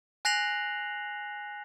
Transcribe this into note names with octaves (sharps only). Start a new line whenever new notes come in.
G#5 F#6 A#6 C7 F7 F#7